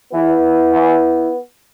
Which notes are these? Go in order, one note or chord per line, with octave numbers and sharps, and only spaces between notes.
E2 E3 B3 E4
E2 E3